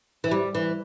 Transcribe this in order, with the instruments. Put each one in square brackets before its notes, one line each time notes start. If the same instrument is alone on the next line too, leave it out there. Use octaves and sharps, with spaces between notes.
[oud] E3
G3
E3